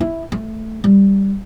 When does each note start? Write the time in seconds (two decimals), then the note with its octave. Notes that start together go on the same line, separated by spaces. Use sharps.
0.01 E4
0.32 A3
0.84 G3